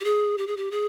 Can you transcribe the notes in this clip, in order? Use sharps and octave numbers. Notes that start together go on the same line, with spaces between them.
G4
G#4
G4
G#4
G4
G#4